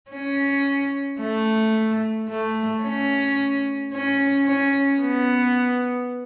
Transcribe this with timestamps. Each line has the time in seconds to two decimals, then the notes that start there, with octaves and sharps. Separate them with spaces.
0.11 C#4
1.20 A3
2.29 A3
2.83 C#4
3.92 C#4
4.46 C#4
5.01 B3